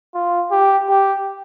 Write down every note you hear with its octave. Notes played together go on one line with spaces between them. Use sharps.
F4
G4
G4